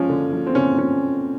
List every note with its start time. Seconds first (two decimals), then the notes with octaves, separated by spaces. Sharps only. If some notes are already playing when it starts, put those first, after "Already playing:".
Already playing: F3 G#3 C#4
0.09 D3
0.33 F3
0.47 C4
0.55 D3 C#4
0.78 F3 C#4